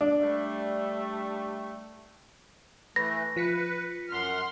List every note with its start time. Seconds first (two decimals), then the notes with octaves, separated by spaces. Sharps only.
0.01 D4
0.20 G3 A3
2.96 E3 A3 B4 A#6
3.36 F3 B4 B6 C#7
4.09 F#2 F#5 C6 F6